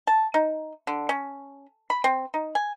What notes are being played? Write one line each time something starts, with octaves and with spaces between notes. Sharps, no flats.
A5
D#4
D3
C#4
B5
C4
D#4
G#5